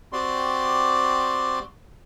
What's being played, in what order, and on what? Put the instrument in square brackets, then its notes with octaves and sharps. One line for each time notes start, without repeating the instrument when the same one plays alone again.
[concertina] C4 F#4 G4 D5 C6